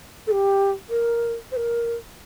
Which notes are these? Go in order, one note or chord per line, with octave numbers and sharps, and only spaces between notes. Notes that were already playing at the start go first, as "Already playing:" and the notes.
A4
G4
A#4
C5
A#4